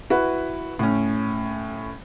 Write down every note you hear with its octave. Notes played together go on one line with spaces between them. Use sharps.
E4 F#4 B4
A2 C#4